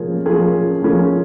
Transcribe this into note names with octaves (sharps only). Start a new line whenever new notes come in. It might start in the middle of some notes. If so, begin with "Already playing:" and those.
Already playing: F3 A#3 C#4 G#4
F3 A#3 C#4 G#4
F3 A#3 C#4 G#4